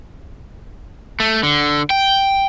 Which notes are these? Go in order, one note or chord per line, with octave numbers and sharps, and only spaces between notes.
A3
D3
G5